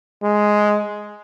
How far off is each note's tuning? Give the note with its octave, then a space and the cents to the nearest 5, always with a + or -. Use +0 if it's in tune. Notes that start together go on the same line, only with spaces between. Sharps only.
G#3 +5